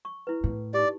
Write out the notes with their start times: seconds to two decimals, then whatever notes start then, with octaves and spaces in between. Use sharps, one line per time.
0.05 C#6
0.27 E4 B4
0.44 A2
0.74 D#4 G4 D5